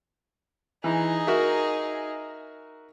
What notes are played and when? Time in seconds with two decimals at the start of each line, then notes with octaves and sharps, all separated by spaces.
0.84 E3 D#4 G#4
1.27 F#4 A#4 E5